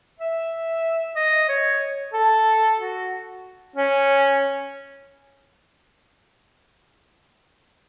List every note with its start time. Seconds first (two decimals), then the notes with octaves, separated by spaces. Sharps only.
0.19 E5
1.16 D#5
1.48 C#5
2.13 A4
2.78 F#4
3.76 C#4